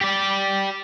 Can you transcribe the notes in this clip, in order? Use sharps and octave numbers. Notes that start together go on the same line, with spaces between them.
G4 D5